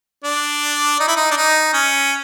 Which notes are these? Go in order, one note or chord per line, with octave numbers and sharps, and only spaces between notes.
D4
D#4
E4
D#4
D4
D#4
C#4